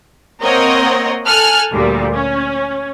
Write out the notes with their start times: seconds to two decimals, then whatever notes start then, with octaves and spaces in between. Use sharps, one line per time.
0.42 A#3 C4 A#4 C#5 D#5 F#5
1.27 A4 G#5 F6 F#6
1.71 D2 A#2 G3
2.14 C#4